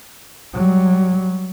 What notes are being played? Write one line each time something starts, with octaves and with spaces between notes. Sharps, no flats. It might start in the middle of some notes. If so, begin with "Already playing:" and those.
F#3 G3